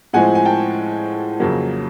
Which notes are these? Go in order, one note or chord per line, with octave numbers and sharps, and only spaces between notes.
A2 F3 G#3 C4 F#5 G#5
G#5
G5 A5
F2 C#3 F#3 A#3